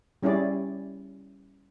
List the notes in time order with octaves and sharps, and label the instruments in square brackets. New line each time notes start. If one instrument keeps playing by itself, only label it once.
[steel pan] G3 C#4 E4 G#4 D5